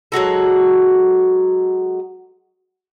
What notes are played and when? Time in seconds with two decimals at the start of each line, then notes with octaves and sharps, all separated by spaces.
0.12 F#3 G#3 F#4 A4